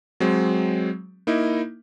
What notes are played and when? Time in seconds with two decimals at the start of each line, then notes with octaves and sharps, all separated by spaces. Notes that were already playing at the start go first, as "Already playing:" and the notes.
0.20 F#3 G#3 C4
1.27 A#3 D#4 E4